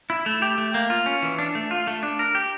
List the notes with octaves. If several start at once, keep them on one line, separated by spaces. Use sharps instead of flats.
E4
A3
G4
A3
A#3
F4
C#4
E3
D4
A3
F4
A3
D4
A#4
G4